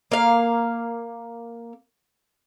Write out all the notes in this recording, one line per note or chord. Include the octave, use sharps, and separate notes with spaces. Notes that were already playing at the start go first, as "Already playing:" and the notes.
A#3 F5